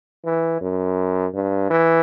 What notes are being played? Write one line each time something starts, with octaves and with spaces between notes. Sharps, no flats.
E3
F#2
G2
E3